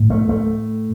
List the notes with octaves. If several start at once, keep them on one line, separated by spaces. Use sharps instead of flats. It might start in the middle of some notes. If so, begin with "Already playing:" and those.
Already playing: A2
A3
A3